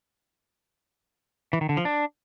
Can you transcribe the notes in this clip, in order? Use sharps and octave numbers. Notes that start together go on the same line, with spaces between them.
E3
D#3
D3
F3
D4